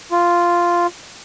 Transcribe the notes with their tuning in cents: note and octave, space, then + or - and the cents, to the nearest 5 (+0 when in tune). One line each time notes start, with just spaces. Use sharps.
F4 -5